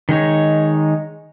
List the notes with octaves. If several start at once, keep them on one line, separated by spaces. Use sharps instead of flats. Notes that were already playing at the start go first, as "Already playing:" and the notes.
D#3 G#3 D#4 C#5